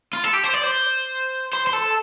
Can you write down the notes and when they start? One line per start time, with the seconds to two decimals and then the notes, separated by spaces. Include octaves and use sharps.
0.13 F4
0.24 A4
0.33 G4
0.44 C5
0.53 D5
0.63 C5
1.53 C5
1.67 C5
1.73 A4